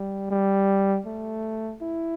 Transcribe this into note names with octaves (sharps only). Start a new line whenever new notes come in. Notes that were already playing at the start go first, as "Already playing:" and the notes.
Already playing: G3
G3
A3
E4